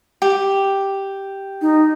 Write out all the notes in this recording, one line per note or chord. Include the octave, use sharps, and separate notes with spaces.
G4
D#4